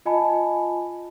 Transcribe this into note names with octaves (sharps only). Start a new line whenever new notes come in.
F4 D#5 G#5 A5 B5